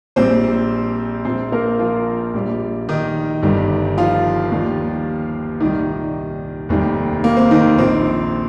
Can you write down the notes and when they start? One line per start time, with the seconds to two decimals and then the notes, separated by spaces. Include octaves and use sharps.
0.16 A#1 A#2 G3 C4 C5
1.25 A#1 A#2 F3 C4 C5
1.52 A#3 A#4
1.79 F3 F4
2.34 A#1 A#2 G3
2.89 D#3 D#4
3.43 G1 G2 D#3 G3
3.98 F3 F4
4.52 D#2 D#3 G3
5.60 C2 A#2 D#3 G3 D#4
6.69 F1 D#2 D#3 G3
7.24 A#3
7.37 C4
7.51 D#3 D#4
7.78 A#1 A#2 F3 C4